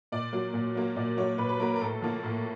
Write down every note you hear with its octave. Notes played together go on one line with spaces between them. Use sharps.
A#2 D5
F#3 A#3
A#2
F#3 A#3
A#2 D5
F#3 A#3 C#5
A#2 B4
B4
F#3 A#3 A#4
A#4
A2 A4
F3 A#3
A2